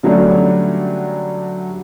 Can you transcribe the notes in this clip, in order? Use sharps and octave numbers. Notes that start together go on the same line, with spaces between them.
D3 F#3 G3 A3 C#4 D4